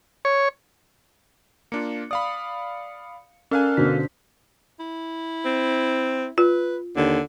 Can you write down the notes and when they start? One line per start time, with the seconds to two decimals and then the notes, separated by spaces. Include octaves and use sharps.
0.25 C#5
1.72 A#3 D4 F4 C#7
2.11 D5 F5 B5 D#6
3.51 C#4 A4 A#4 F5 G#5 F6 F#6
3.77 B2 D3 D4 C5 B6
4.80 E4
5.45 C4
6.38 F4 B4
6.96 D#2 D3